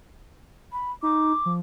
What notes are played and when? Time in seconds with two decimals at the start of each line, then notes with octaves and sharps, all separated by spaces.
0.72 B5
1.03 D#4 D6
1.46 F3